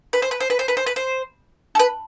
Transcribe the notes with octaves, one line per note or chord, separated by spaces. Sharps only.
B4
C5
B4
C5
B4
C5
B4
C5
B4
C5
A4
B4